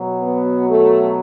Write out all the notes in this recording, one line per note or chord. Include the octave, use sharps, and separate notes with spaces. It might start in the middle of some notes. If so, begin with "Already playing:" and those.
Already playing: B2 F#3
B3
A3